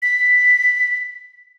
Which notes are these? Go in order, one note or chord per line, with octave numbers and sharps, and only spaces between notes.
B6